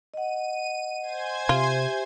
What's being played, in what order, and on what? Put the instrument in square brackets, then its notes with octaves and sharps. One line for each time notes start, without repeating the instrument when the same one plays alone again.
[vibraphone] D#5 F#5 [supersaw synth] D#7
[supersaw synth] C5 G#5 G#6
[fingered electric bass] C3 [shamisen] F4 [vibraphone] G4 E5